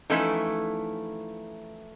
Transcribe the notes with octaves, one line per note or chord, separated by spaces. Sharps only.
E3 F3 A3 C#4 D#4 E4